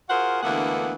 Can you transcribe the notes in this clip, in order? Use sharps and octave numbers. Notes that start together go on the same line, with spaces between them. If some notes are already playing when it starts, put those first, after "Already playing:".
F4 F#4 G#4 A#4 C5 F#5
D2 D3 E3 A#3 B3 F#5